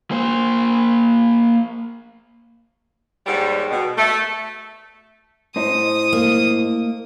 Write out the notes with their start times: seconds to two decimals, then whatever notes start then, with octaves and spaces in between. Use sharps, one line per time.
0.11 A#3 C5
3.26 D#2 G#2 G3
3.70 B2
3.97 A3
5.56 A2 D#4 C5 D#6
6.13 A#3